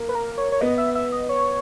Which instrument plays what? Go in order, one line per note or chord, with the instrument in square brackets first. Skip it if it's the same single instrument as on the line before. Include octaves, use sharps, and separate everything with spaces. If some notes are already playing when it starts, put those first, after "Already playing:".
Already playing: [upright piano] A#3
[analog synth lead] B4
A#4
C#5
C#5
[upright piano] B3 [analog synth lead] D#5
[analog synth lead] E5
E5
D#5
C#5